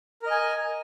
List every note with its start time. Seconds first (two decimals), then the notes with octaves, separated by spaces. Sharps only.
0.22 A#4
0.26 D#5
0.31 G#5